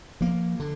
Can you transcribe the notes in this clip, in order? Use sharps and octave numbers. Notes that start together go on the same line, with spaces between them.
F3 A#3
D3